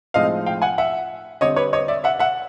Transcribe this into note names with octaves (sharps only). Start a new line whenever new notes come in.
A2 F3 G#3 C4 D#4 D#5 F5
F5 G5
F#5 G#5
E5 F#5
D3 G3 C4 C#5 D#5
B4 C#5
C#5 D#5
D5 E5
E5 F#5
E5 F#5